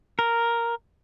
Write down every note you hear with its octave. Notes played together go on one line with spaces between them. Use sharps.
A#4